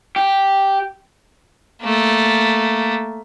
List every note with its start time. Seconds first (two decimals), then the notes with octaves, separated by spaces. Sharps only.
0.16 G4
1.82 A3 A#3